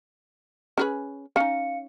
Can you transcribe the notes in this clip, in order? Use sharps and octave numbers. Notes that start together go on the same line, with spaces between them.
C#4 G#4 B4
C#4 D#4 F5 C#7